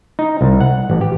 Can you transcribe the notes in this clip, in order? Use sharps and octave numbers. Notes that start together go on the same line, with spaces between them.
D#4
C2
F#5
A1
G4